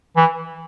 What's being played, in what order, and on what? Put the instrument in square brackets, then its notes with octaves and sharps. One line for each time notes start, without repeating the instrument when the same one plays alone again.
[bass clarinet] E3